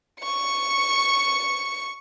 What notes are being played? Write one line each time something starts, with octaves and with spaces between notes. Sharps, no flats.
C#6 C#7